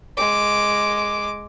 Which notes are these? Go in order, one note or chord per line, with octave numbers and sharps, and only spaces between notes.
G#3 D6